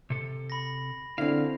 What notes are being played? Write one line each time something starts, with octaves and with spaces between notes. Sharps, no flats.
C3 A4
B5 A#6
D3 C4 E4 F5